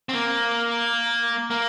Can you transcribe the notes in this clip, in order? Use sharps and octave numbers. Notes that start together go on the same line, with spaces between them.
C4
A#3
A#3